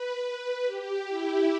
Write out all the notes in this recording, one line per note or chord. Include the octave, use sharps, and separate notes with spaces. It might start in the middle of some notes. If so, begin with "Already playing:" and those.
Already playing: B4
G4
E4